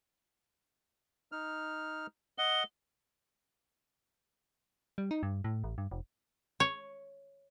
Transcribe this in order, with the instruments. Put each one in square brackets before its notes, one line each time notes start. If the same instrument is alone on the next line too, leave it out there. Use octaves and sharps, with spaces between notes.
[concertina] D#4 F6
[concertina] D#5 F#5 [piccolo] G7
[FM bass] G3
D#4
G2
A2
A1
G2
F1
[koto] C#5